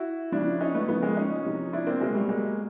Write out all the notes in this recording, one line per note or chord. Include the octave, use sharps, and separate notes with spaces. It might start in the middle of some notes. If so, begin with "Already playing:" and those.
Already playing: E4 F#4
C#3 F3 D4 E4
C#4 D#4
A3 B3
C#3 F3 A3 B3
G#3 A#3
C#4 D#4
C3 F3
D4 E4
A#3 C4
B2 F#3 G#3 A#3
G3 A3
G#3 A#3